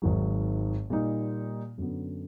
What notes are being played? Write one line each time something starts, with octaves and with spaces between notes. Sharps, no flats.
G#1 G#2 D#3 F#3
A#2 G3 A#3 D#4
F#2 D3 F#3 B3